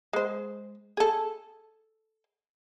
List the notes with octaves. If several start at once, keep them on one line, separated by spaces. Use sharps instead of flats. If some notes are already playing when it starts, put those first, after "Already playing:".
G#3 C5
G#4 A4